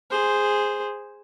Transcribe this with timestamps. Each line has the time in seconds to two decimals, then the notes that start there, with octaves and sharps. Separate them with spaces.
0.10 G#4 C5